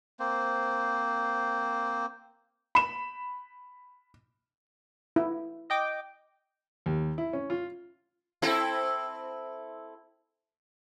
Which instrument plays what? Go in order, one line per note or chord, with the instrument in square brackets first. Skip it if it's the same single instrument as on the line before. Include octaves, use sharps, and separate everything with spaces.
[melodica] A#3 C4 C5
[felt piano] B5 E7
[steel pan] E4
[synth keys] D#5 G5 D6
[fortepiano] D#2
E4
C#4
F4
[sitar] C4 E4 A4